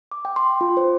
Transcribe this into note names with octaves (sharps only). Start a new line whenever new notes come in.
D6
G5
C6
F4
C5